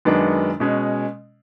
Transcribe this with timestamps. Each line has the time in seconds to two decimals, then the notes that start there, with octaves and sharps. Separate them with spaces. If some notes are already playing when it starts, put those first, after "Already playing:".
0.05 F#2 D#3 G#3 B3 D4
0.60 B2 G#3 C#4